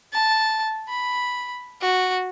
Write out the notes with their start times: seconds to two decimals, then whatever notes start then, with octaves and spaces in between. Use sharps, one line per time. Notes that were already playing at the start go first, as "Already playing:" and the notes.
0.13 A5
0.89 B5
1.81 F#4